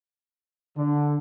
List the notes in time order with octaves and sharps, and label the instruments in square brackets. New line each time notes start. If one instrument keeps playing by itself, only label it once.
[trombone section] D3